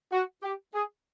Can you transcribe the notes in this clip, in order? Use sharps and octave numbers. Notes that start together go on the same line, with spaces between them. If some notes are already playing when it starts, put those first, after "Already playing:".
F#4
G4
G#4